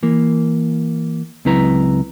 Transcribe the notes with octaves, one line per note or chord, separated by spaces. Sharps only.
E3 A#3
C#2 F#3 C4 E4 B4 A#5